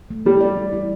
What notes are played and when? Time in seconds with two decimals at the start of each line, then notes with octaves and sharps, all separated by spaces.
0.11 A3
0.26 G3 E4
0.41 D5
0.57 G3
0.73 E4